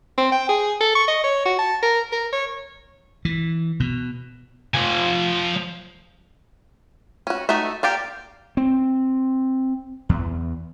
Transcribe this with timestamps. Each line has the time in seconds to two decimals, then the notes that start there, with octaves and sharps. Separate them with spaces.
0.18 C4
0.32 G5
0.49 G#4
0.81 A4
0.95 C#6
1.08 D#5
1.24 C#5
1.46 F#4
1.59 A5
1.82 A#4
2.12 A#4
2.33 C#5
3.25 E3
3.80 B2
4.75 F3 G#5
7.27 C#4 F#4
7.49 A3 D#4 F#4 E5
7.83 A#3 G4 D5 F5
8.57 C4
10.09 E2